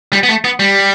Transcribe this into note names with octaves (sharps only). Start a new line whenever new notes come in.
G3
B3
A3
B3
G3